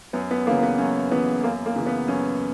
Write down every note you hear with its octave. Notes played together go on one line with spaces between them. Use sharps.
F#2 B3
B3
C#3 E3 A#3
B3
F#2 C#4
C#3 E3 B3
F#2 A#3
A#3
C#3 E3
B3
F#2 C#4